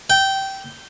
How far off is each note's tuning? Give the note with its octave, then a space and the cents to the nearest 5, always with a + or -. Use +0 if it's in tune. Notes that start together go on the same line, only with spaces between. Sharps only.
G5 -15